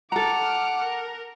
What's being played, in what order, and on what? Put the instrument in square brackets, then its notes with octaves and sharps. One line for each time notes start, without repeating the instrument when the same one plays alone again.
[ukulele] A4 A#5 [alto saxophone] F#5 [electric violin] D6 F6
[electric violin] A#4